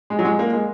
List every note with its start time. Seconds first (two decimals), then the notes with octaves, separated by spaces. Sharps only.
0.10 G#3
0.19 F#3
0.25 G#3
0.39 A#3
0.53 G#3